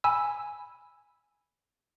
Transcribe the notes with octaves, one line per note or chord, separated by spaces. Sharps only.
G#5 B5 E6